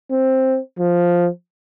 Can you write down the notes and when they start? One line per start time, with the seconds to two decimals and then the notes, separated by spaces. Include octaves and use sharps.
0.11 C4
0.79 F3